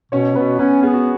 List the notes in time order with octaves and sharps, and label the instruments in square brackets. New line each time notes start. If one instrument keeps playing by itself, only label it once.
[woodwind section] B2 [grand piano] C#4 C#5
[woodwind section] B2 [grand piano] B3 B4
[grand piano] B3 B4 [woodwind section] C#4
[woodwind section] B3 [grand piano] G#4
[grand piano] F#4